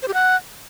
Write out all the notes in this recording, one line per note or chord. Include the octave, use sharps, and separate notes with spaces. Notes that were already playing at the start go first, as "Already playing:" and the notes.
C5
G4
F#5